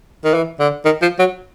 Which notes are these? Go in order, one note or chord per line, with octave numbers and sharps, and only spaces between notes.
D#3
E3
D3
D#3
F3
F#3